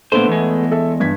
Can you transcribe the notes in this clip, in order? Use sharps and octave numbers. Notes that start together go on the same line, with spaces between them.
A#2 D3 A3 B3 C5
E2 G#3
A4 E5
G2 G#6 B6